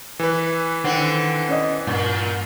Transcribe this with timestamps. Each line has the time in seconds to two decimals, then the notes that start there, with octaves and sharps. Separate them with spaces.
0.19 E3 B4
0.84 D3 D#3 C4
1.49 C#4 D5 D#5
1.87 G2 A#2